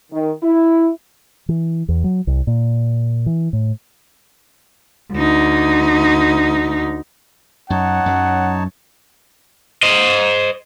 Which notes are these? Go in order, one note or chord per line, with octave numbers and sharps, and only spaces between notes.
D#3
E4
E3
E2
F#3
C2
A#2
E3
A2
D2 D#4
F#2 D#4 C#5 F#5 A5
F#2 F#3
C5 D#5